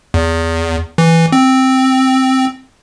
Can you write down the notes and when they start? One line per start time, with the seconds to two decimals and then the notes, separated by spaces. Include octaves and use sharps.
0.14 E2
0.98 E3
1.32 C4